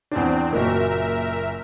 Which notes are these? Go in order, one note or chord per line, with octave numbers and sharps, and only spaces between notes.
E2 C4 D4
F#1 A#2 F#4 A#4 E5